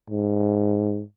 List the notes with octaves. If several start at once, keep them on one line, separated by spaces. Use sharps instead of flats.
G#2